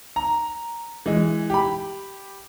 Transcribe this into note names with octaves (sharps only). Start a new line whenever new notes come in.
A#5
E3 G#3
G4 B5